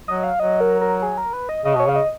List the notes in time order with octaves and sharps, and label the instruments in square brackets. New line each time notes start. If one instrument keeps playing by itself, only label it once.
[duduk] F#3 [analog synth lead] D#5
[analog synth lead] F5
[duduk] F#3 [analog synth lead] D#5
[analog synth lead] A#4
A#4
G#4
A#4
B4
D#5
[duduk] C#3 [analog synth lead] D#5
[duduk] B2 [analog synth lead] C#5
[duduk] C#3 [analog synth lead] F5
[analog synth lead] D#5